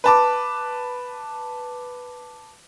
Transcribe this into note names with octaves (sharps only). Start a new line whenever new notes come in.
B4 A5 D6